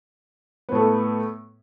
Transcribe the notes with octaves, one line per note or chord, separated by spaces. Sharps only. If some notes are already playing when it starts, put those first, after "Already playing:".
A2 A3 B3